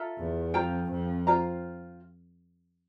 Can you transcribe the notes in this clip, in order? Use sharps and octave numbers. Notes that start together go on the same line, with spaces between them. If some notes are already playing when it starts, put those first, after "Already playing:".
Already playing: F4 A4 E5 A#5
E2
F2 F4 C5 G5 A#5
F2
F4 C5 G5 A#5